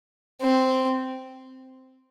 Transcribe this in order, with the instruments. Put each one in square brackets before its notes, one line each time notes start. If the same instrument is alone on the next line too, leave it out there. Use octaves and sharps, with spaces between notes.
[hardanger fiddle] C4